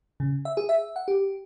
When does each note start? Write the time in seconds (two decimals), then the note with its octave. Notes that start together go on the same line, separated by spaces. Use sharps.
0.20 C#3
0.45 E5
0.57 G#4
0.69 E5
0.96 F#5
1.08 G4